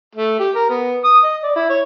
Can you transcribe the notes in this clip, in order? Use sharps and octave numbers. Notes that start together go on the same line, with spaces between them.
A3
G4
A#4
B3
D#6
D#5
D5
E4
C#5